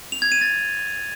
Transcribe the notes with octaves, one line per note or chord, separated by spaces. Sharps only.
F7
G#6
D#7
A6